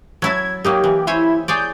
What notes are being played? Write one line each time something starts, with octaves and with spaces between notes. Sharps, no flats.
F#3 E4 A5 G#6
F#3 A#3 D#4 G4
E3
E4 C5 C#5 G#5
G#4 C#5 D5 G6